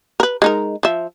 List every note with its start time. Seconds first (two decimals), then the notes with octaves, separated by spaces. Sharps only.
0.20 A#4 B4
0.42 G#3 D#4 A#4
0.83 F3 E5